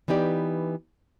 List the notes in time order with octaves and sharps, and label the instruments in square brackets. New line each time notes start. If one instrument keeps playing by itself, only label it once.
[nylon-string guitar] E3 B3 D#4 G4 D5